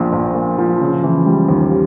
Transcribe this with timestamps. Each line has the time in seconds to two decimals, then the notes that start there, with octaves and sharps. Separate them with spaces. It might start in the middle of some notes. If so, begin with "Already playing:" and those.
Already playing: A#1 A#2 F3
0.13 A#1
0.35 A#2
0.58 F3
0.81 C#3
1.03 E3
1.26 G3
1.48 D#2